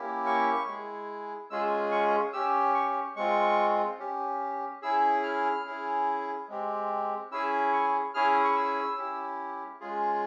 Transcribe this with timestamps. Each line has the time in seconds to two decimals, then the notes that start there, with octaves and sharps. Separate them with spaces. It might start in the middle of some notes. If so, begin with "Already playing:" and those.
Already playing: A#3 C#4 E4 G4
0.26 C#6
0.66 G#3 E4 G#4
1.50 G#3 C#4 F4 G#4 E6
1.92 C#6
2.33 C#4 G4 E6
2.74 C#6
3.16 G#3 C4 F4 C#6
3.99 C#4 G4
4.82 C#4 E4 G#4 E6
5.23 F6
5.65 C#4 E4 G#4
6.48 G#3 C4 G4
7.31 C#4 E4 G#4 E6
7.73 C#6
8.14 C#4 E4 G#4 F6
8.45 C#6
8.56 E6
8.98 C#4 E4 G4
9.80 G#3 C#4 F4 G#4